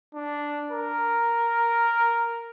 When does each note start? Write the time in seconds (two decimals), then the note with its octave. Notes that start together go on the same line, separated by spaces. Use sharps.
0.14 D4
0.71 A#4